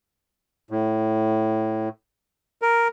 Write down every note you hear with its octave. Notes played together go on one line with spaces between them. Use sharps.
A2
A#4